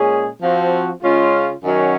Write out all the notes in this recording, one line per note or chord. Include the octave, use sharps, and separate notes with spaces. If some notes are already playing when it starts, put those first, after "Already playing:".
Already playing: A#2 G#3 C#4 G#4
F3 C4 F#4
C#3 G#3 C#4 F4
F#2 D#3 F#3 C#4